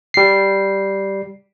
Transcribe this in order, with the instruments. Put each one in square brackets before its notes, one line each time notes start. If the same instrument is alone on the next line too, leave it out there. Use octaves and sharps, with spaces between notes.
[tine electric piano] G3 C7